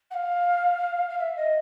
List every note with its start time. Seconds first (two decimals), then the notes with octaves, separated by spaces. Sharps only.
0.10 F#5
0.14 F5
1.08 F5
1.18 E5
1.36 D#5